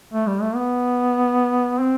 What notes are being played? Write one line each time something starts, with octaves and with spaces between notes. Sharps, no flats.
A3
G3
A3
B3
C4